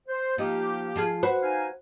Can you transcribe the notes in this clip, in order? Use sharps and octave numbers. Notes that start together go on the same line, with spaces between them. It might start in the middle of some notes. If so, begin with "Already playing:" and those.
C5
F3 A#3 D#4 G4
F3 F4 G#4
F#4 B4 C5
D#4 F5 G#5